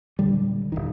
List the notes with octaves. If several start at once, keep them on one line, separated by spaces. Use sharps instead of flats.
D#1 B1 D3 G3
D#1 B1 D#3